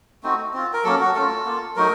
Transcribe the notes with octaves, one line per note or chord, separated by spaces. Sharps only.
A3 C4 D#4 F#4
C4 F4
A#4
F#3 A#3 C#4 A4
F#4
A3 C#4 F4 A4
A#3 F4
F#3 A3 D#4 A#4